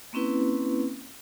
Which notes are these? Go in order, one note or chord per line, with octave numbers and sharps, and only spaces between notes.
A#3 C4 C#4 E4 B4